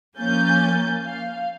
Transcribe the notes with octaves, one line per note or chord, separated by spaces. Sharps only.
F3 A#3 C#4 G#5 G6 A6
F5